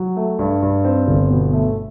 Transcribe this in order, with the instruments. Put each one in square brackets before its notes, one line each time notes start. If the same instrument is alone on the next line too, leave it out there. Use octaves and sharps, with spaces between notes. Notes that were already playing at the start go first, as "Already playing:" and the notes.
Already playing: [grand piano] F#3
A3
G2
G2
C4
G1
B2
A3